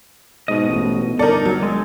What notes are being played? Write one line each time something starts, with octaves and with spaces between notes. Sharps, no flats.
G#2 B2 D#5
A1
G1 D#4 A4 A#4 D5
F#3
G#3